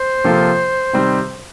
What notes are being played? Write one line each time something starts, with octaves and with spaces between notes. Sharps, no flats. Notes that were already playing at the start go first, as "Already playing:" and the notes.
Already playing: C5
C3 F3 A#3 F4 A4
C3 D#3 G3 C4